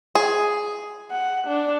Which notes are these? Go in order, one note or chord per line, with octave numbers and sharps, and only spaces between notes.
G#4
F#5
D4